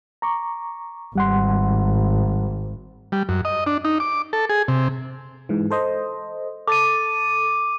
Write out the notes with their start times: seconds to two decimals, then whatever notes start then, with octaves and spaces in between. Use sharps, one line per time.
0.22 A#5 C#6 D6
1.15 G#1 G3 F#5 C6
3.12 G3
3.29 F#2
3.45 D#5
3.66 D4
3.85 D#4
4.00 D6
4.33 A4
4.50 G#4
4.68 C3
5.49 G#2 E3
5.70 A4 C5 D#5
6.67 A4 D6 A6 D#7